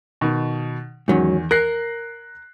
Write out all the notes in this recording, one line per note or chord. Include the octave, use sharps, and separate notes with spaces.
B2 D#3
E2 G#2 D#3 F#3 C#4
A#4 F#6 A#6 C7